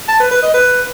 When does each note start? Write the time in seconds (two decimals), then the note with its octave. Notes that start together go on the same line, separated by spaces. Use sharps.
0.09 A5
0.20 B4
0.31 B4
0.43 D#5
0.54 B4